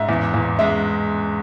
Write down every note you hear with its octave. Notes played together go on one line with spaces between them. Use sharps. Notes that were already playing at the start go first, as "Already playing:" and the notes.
Already playing: G#2 E5
E2
E2
G#3 E5